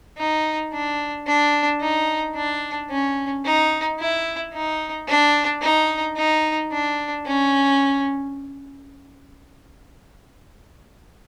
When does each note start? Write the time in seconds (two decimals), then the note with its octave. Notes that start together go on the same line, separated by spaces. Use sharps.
0.18 D#4
0.73 D4
1.27 D4
1.81 D#4
2.35 D4
2.90 C#4
3.45 D#4
4.00 E4
4.54 D#4
5.08 D4
5.62 D#4
6.16 D#4
6.72 D4
7.26 C#4